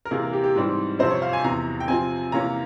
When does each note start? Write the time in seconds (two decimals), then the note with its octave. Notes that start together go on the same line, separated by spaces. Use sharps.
0.05 A#4
0.11 C3 E3 A#3 G#4
0.22 A#4
0.33 G4
0.44 G4
0.56 G#2 E3 G3 C4
0.99 F2 C3 F3 C4 C5
1.11 C#5
1.22 F5
1.33 G#5
1.43 E2 C3 E3 A#5
1.80 G5
1.88 C3 F3 C4 G#5
2.32 C3 E3 A#3 C#4 A#5